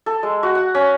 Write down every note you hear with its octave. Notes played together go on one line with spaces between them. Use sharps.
A4
G#3
F#4
F#5
C#4